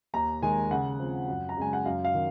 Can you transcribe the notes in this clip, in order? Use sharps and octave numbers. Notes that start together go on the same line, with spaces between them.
D#2 A#5
D#3 G#3 G#5
C#3 F#5
F3 C4
F#2
A#5
C#3 G#3 G#5
F#5
F#2 F5
F5
D#3